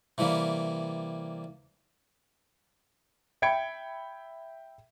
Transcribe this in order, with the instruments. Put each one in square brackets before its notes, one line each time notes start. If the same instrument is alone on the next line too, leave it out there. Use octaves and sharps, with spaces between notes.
[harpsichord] C3 E3 G3 A#3
[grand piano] E5 G5 B5 G#6 C#7 D7